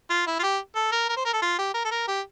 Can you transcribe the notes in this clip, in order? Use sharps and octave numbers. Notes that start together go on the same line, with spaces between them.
F4
E4
F4
G4
A4
A#4
A#4
C5
A#4
A4
F4
G4
A#4
A4
A#4
G4